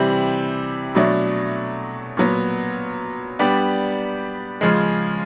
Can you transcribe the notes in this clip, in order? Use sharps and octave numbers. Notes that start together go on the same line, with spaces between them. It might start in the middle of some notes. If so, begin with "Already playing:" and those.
Already playing: C3 E3 G3 C4
B2 F#3 A3 D4
A#2 F#3 B3
G3 B3 D4 G4
C#3 F3 G#3